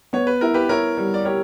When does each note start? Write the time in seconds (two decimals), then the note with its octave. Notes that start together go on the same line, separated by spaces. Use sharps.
0.13 B3 C#5
0.27 B4
0.41 E4 A#4
0.54 G4 B4
0.69 E4 A#4 C#5
0.97 G3
1.14 D5
1.25 G4 A#4 C#5